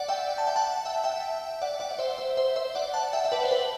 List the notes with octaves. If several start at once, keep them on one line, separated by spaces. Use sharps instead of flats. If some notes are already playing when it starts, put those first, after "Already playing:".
Already playing: D5 F#5
E5 G5
A5
G5
F#5 A5
E5 G5
E5 G5
D5 F#5
D5 F#5
D5
C5 E5
C5 E5
C5 E5
C5 E5
D5 F#5
F#5 A5
E5 G5
E5
B4 D5
C5
B4